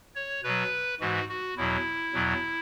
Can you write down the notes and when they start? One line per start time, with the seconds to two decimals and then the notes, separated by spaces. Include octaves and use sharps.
0.15 C#5
0.44 B2 F#3 B4
1.00 G#2 E3 G#3 F#4
1.29 F#4
1.57 E2 B2 F#3 E4
2.14 E2 B2 F#3